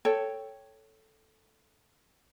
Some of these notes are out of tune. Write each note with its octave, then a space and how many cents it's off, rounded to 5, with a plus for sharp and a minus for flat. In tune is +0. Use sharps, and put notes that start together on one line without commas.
A4 +0 C#5 +0 G5 +0